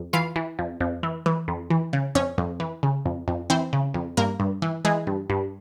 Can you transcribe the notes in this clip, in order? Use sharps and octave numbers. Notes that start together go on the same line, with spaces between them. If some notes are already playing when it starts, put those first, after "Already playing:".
Already playing: F2
E3 F4 F5
E3
F2
F2
E3
E3
F2
E3
C#3
F2 C#4 C#5
F2
E3
C#3
F2
F2
E3 C4 C5
C#3
F2
G2 A#3 A#4
G2
E3
E3 G#3 G#4
G2
G2